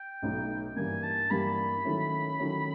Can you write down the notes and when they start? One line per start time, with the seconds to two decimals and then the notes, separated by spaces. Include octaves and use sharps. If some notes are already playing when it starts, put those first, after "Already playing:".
Already playing: G5
0.22 B1 A2 F#3 B3 D#4
0.76 G2 E3 G3 A#3 G#5
1.03 A5
1.30 G2 E3 G3 A#3 B5
1.84 D#3 F#3 A3 C#4 E4
2.38 D#3 F#3 A3 C#4 E4